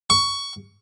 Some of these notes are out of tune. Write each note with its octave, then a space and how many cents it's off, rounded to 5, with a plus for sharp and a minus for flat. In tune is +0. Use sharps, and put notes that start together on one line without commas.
C#6 +15